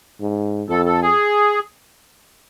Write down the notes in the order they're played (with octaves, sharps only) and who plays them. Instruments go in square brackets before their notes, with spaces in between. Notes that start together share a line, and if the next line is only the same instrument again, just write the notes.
[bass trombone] G#2
[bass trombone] F2 [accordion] A4
[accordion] A4
G#4